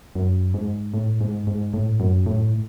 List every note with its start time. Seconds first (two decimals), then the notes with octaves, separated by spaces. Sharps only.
0.15 F#2
0.54 G#2
0.94 A2
1.21 G#2
1.47 G#2
1.73 A2
2.00 F#2
2.26 A2